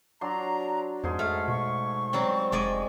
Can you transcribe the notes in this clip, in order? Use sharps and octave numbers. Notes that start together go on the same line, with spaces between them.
F#3 D4 A#5 C6
F2 G#2 G#4 C6
A3 F6
B2 C#6
F#3 G3 C4
F1 G#3 D5 D#5